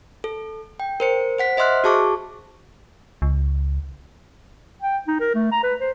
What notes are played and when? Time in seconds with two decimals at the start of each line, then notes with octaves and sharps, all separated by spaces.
0.24 A4
0.80 G5
1.00 A#4 C5 C#7
1.38 C5 F#5 B6
1.57 C5 D#5 E5 C6 F6 F#6
1.84 F#4 G#4 A5 C#6 D6
3.22 C#2
4.82 G5
5.08 D#4
5.20 A#4
5.35 A3
5.52 A#5
5.63 B4
5.80 C5